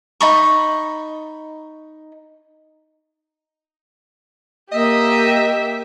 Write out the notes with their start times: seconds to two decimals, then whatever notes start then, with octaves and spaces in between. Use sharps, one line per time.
0.21 D#4 B5 C#6
4.73 A#3 G4 D#5 E5